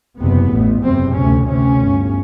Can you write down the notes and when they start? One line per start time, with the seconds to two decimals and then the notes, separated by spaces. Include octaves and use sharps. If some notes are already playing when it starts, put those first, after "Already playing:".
0.19 F#1 E2 C3 B3
0.50 A1 A2
0.83 F#1 E2 C3 C4
1.14 D2 C3 C#4
1.46 D2 C3 C#4
1.79 G1 G2